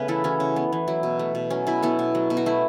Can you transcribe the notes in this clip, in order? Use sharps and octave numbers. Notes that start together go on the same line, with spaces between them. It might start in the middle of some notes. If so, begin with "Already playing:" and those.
Already playing: C#3 A3 B3 B4
E3 E4 A4
E3 C#4 F#4
C#3
B3
E3
F#3 E4
B2
A3
B2
F#3 C#4
B2 E4
B3 E4 A4
B2
F#3
B2
F#4
A3 E4